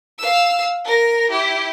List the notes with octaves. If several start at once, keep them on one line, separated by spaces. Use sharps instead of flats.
F5 E6
A#4 A#6
E4 G4